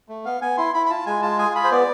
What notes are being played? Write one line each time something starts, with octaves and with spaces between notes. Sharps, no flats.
A3
B3 F5
B3 G#5
E4 C6
E4 B5
B5
F4 A5
G#3 G#5
F4 A5
G#4 G#5
F4 B5
C5
B3 D5